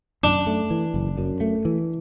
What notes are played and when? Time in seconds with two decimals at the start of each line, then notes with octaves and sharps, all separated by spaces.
0.24 F#2 D4
0.47 A3
0.71 E3
0.94 F#1
1.18 F#2
1.41 A3
1.65 E3